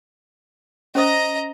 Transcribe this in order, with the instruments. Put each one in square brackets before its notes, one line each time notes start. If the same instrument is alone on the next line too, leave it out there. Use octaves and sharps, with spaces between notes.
[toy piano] C#4 C5 D#6 [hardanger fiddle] D#5 A#5